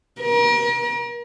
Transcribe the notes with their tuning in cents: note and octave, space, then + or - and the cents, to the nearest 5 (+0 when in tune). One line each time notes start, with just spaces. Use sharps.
A#4 +35